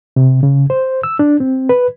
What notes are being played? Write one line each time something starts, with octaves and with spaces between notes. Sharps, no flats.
C3
C#3
C5
E6
D4
C4
B4